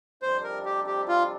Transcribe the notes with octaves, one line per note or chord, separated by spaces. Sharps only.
F2 C3 G3 D4 C5
A#4
G4
G4
F4